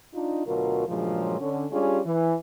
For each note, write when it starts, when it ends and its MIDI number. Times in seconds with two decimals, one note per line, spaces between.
0.14 0.46 62
0.14 0.46 63
0.14 0.46 65
0.46 0.86 38
0.46 0.86 47
0.46 0.86 54
0.46 0.86 65
0.46 0.86 70
0.88 1.40 43
0.88 1.40 46
0.88 1.40 49
0.88 1.40 53
0.88 1.40 54
0.88 1.40 56
1.40 1.65 50
1.40 1.65 61
1.71 2.00 55
1.71 2.00 61
1.71 2.00 62
1.71 2.00 65
1.71 2.00 67
1.71 2.00 68
2.06 2.35 52